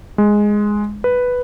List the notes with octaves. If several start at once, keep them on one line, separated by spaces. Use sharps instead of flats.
G#3
B4